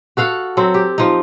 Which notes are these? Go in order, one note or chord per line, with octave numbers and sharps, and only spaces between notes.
F#4 A4 F5 F#5
F#3 C4 A4
G4
F3 D#4